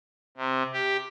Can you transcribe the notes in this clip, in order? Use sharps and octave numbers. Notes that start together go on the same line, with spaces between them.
C3
G4